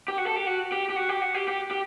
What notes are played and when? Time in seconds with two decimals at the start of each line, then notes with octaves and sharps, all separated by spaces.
0.08 G4
0.18 F#4
0.27 A4
0.36 G4
0.47 F#4
0.72 G4
0.90 G4
0.96 F#4
1.09 G4
1.22 F#4
1.35 G4
1.48 G4
1.71 G4